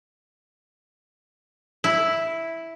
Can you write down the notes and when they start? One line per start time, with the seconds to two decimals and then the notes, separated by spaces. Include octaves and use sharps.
1.84 E4